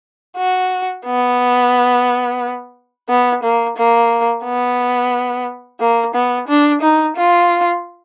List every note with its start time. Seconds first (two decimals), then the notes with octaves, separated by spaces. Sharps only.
0.37 F#4
1.06 B3
3.09 B3
3.43 A#3
3.77 A#3
4.44 B3
5.80 A#3
6.14 B3
6.48 D4
6.81 D#4
7.16 F4